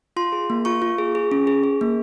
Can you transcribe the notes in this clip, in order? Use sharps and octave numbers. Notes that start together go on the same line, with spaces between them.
F4 C6
G#4
A#3
F4 C#6
F4
G#4
G#4
C#4
G#4
G#4
A#3